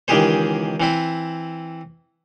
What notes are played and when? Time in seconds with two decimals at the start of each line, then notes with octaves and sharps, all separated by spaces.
0.08 C#2 D#3 E3 G4 G#4 C5
0.80 E3 C4 E4